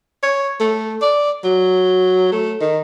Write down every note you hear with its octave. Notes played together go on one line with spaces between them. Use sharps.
C#5
A3
D5
F#3
A3
D#3